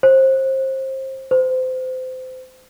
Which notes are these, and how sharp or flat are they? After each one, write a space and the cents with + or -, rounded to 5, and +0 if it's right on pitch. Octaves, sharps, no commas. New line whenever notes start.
C5 +25
C5 -25